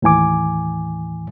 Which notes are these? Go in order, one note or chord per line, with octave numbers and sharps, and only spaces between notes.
D#2 A2 E3 G#5 D6